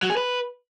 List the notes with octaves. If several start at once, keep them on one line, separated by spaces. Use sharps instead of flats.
F#3
G#4
B4